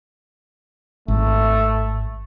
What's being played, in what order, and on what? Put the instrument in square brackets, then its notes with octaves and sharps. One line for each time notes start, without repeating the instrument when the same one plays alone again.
[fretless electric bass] G#1 [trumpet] A3